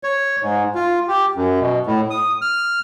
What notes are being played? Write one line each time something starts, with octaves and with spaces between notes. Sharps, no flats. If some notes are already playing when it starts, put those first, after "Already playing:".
C#5
G#2
F4
G4
F#2
B2
A2
D#6
F6